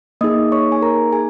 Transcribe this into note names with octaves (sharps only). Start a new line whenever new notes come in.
A#3 D#4 G#4 D#5 D#6
C#5 C#6
G#5
A#4 A#5
G#4 G#5